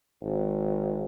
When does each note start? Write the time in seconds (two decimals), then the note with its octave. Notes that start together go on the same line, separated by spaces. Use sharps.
0.22 G#1